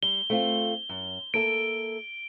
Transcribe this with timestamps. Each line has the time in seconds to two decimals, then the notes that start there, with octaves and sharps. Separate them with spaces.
0.03 G3 G7
0.30 A3 C4 F4
0.89 F#2
1.34 A#3 A4 E5 D7